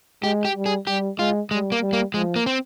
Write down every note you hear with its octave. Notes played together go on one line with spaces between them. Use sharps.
G#3 G4
G4
G3
G#4
G3 G4
G#3 F4
G3 G#3
A#3
G3
A#3
F3 G#3
A#3
C4